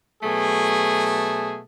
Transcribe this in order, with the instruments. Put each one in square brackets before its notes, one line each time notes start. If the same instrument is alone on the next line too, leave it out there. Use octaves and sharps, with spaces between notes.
[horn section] B2 F#3 A3 G#4